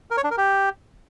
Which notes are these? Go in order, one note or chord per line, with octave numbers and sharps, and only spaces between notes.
A#4
C#5
D4
A#4
G4